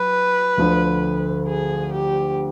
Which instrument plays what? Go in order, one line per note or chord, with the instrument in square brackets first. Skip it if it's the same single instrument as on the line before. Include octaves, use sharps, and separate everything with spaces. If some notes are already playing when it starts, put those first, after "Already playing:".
Already playing: [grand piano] F#3 [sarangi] B4
[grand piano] D2 D3 F3
[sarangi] G#4
G4